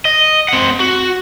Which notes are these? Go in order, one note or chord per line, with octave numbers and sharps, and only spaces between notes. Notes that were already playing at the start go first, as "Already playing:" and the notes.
D#5
C4 F#5
F#4